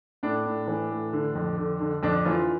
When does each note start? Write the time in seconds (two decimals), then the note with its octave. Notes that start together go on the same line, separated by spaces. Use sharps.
0.23 A2 D4
0.46 A2
0.68 E3
0.90 A2
1.13 D3
1.35 F2
1.58 D3
1.80 D3
2.03 F2 D4
2.25 E3 F4